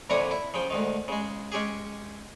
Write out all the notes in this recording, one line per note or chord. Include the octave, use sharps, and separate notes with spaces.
F2 A#2 D3 E4 C#5 D#6
E4
C#3 F3 G5
D2 G#2 D#3
C#3 G#3
G#3 C#4 G4 G#4